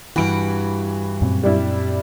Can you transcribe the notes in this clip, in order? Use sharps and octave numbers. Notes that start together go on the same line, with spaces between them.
G2 E3 F#4 B5 D7
F#2 A#2 C4
G3 D4 E4